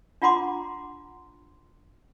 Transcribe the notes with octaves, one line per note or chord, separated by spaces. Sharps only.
D4 F4 F#5 A#5 C6 D6